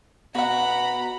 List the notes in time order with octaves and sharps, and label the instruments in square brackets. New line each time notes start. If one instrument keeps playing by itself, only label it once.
[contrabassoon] B2 [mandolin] F#4 F#5 [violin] A#5 B5